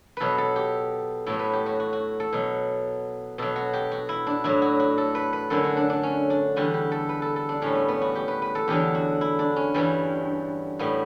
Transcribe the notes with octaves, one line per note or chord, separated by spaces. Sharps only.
B2 F#3 A4 B4
A4
G4
A2 F#3 A4
B4
G4
F#4
F#4
F#4
A4
B2 F#3
B2 F#3 A4
F#4
G4
F#4
E4
D4
A2 F#3 E4
F#4
F#4
A4
B4
B4
F#2 D3 F#3 A4
F#4
D4
D4
C#4
D4
E2 D3 G3 F#4
G4
A4
B4
A4
A4
D4
A2 G3 C#4
B3
B3
F#4
G4
B4
B4
A4
E2 D3 F#3 G4
F#4
E4
D4
C#4
G2 E3 G3
A2 G3 B3